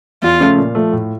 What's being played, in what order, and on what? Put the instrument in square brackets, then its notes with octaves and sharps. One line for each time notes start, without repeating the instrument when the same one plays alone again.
[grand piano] E2 [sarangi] F4
[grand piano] C#3 F3 A3 C#4
A#2
F3 A3
A2